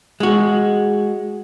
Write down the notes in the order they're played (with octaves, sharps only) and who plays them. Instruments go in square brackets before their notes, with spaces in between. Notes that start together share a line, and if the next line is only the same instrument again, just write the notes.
[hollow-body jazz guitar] G#3 F#4